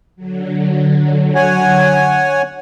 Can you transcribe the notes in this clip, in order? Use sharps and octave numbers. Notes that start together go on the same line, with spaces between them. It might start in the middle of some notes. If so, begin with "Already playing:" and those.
D3 F#3
C#5 F#5 G#5